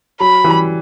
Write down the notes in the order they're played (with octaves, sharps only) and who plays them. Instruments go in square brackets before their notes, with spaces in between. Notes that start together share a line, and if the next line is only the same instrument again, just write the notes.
[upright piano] F#3 [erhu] B5
[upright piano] E3 G3